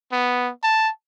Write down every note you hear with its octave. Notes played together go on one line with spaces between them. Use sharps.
B3
A5